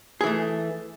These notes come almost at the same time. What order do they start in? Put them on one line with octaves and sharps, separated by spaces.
G#4 E3 A3